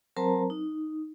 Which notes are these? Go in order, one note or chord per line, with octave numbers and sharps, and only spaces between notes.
F#3 C4 A#4 C5 A5 A#5
D#4